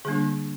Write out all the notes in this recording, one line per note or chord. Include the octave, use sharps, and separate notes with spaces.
D3 G3 A#3 D4 G#4